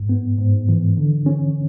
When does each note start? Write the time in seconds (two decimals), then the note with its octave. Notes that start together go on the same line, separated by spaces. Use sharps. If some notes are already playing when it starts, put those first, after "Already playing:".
Already playing: G#2
0.09 B3
0.38 G#2
0.69 E3
0.97 D3
1.26 C#4